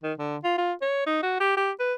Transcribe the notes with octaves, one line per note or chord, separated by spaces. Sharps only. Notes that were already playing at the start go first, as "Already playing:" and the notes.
D#3
D3
F4
F4
C#5
D#4
F#4
G4
G4
B4